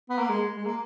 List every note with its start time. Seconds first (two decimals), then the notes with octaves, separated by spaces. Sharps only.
0.10 B3
0.19 A#3
0.29 G#3
0.56 G#3
0.65 A#3